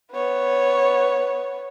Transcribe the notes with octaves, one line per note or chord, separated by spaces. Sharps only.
B3 C#5